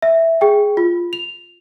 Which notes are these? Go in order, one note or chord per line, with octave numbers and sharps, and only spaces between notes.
E5
G#4 G5
F4
F7